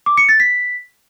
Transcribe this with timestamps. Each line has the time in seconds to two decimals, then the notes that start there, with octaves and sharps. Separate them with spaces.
0.06 D6
0.17 C#7
0.29 A6
0.40 B6